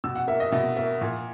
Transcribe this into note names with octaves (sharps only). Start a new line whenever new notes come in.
B2 E6
F#5
A#3 E5
D#5
B2 E5
A#3 E5
A#2